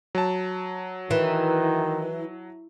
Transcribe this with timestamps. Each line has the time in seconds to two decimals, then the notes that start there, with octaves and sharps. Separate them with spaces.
0.15 F#3 A5
1.11 D#3 E3